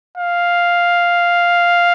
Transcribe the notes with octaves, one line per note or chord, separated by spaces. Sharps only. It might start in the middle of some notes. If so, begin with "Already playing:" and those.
F5